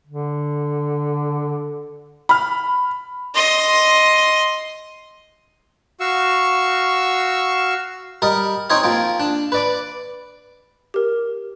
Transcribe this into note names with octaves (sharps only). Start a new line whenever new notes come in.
D3
B5 F6
D#5 C6
F#4 F5 C#6 E6
G3 A#4 D#5
C4 D#4 C5 C#5 D#5
F3 A#3 C4
D4
B4 D5 D6
G4 A#4